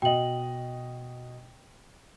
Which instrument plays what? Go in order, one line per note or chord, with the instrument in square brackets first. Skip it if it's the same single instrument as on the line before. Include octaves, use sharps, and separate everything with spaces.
[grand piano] B2 D#5 [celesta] G5 F#7